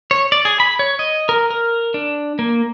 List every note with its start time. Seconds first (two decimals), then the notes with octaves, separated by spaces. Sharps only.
0.11 C#5
0.32 D5
0.45 G#4
0.60 B5
0.79 C#5
0.99 D#5
1.29 A#4
1.50 A#4
1.94 D4
2.39 A#3